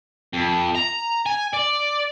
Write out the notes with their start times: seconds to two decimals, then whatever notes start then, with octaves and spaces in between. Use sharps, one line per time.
0.33 F2
0.76 A#5
1.26 G#5
1.53 D5